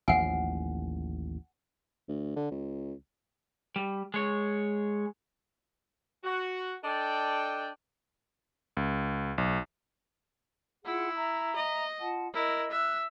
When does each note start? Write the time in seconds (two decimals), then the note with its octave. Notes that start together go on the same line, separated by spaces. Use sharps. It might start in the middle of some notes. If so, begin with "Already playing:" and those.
0.08 A1 D#2 F3 F#5 G#5
2.08 D2
2.36 D3
2.51 C#2
3.76 G3
4.14 G#3 C#5
6.24 F#4
6.84 D4 A4 D5 D#5 G5
8.77 C#2
9.38 B1
10.85 E4 F4 G#4 F#5
11.16 E5 A#5
11.56 D#5
11.99 F4 F#5 A5
12.34 E4 A#4 D#5
12.71 E5 F#6